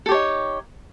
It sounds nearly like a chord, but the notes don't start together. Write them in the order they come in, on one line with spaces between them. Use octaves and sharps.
A4 G4 C#5 D#4